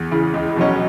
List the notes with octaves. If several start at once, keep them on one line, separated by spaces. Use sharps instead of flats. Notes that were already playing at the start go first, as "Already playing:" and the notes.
Already playing: E2
C#3 E3
C#2
B2 F#3 C#4